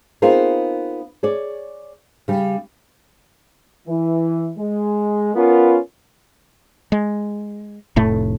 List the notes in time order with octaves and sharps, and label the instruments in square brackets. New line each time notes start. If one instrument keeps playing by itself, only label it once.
[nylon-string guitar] B3 C4 D#4 F4 G#4 A#4
G#4 C#5 D5
C#3 G3
[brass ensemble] E3
G#3
B3 C#4 F4 A#4
[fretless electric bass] G#3
F1 A2 A3